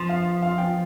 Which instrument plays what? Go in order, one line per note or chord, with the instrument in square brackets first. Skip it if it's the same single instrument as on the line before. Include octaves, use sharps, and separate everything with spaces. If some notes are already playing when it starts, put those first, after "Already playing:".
Already playing: [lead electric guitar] F3 [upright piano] C6
[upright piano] F5
F5
G5